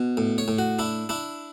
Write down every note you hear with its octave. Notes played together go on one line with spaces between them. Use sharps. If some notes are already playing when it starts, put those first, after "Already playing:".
Already playing: B2
A2
C#5
A2
F#4
D4 E4
D4 E4